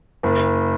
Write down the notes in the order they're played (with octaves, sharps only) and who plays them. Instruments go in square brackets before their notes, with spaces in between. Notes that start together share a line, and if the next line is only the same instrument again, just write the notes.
[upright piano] F#1